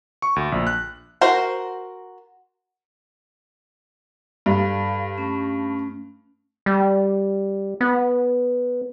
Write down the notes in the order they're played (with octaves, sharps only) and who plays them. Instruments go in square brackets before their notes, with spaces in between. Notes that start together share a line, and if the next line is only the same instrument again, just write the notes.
[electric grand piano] C#6
D2
A#1
F#6
[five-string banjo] F#4 A#4 C5
[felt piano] G2 [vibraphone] A4 F5
[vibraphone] A3 C#4
[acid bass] G3
B3